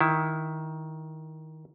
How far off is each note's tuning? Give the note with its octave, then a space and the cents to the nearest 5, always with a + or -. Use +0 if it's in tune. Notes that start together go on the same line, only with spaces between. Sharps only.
D#3 +15 E4 +0